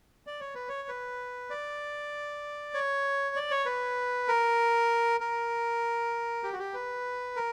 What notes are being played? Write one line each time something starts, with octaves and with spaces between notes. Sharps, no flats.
D5
C#5
B4
C#5
B4
D5
C#5
D5
C#5
B4
A#4
A#4
G4
F#4
G4
B4
A#4